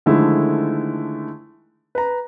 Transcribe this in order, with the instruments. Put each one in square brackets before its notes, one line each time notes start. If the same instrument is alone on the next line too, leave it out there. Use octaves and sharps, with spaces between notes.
[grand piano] D3 D#3 F3 G#3 A3 E4
B4 A#5